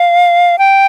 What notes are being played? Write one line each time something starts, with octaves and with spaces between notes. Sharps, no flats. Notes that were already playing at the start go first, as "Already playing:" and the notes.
Already playing: F5
G5